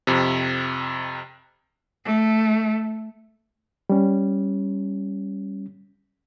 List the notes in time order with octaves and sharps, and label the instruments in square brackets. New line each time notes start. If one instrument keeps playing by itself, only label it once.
[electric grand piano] F2 C3
[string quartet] A3
[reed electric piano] G3 C#4